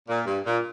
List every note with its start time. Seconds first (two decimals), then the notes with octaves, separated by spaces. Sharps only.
0.09 A#2
0.27 G2
0.46 A#2